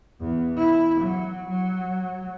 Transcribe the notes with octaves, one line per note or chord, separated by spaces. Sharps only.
E2
E4
F#3
F#3